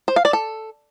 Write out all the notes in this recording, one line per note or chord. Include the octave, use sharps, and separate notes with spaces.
C5
F5
D5
A4